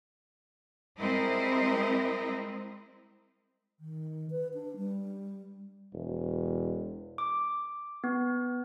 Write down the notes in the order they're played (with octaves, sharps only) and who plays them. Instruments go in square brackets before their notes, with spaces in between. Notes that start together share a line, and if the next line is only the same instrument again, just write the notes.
[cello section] G3 G#3 C4 E4 A#4 D#5
[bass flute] D#3
B4
D4
G3
[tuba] E1
[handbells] D6
B3